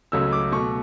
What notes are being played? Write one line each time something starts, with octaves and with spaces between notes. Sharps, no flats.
C#2 C#3 F#3 A3 E6
D6
B2 A3 C#6